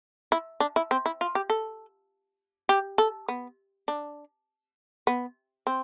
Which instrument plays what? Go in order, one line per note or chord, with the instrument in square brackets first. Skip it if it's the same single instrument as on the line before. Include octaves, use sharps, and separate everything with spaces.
[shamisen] E4
D4
E4
C4
E4
F4
G4
A4
G4
A4
B3
D4
B3
C4